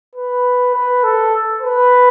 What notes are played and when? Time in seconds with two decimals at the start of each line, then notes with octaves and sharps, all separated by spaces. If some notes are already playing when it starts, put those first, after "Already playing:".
0.15 B4
0.74 B4
1.03 A4
1.62 B4